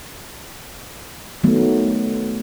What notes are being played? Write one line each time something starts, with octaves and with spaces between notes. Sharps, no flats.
D#3 F#3 A3 B3